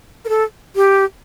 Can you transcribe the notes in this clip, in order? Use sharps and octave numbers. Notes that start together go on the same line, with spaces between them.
A#4
A4
G4